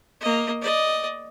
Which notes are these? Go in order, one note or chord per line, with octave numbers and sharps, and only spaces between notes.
A#3 D#5
D5 D#5